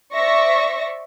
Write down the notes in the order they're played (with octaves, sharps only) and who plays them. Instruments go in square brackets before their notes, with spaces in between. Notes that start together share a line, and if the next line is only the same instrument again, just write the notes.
[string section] C5 D5 E5 C#6 A#6